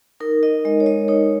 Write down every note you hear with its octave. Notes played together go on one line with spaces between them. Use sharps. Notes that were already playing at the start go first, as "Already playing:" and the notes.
D#4 A#4
D#4 D#5
G#3 D#5
C#5
G#3 D#5
D#4 C#5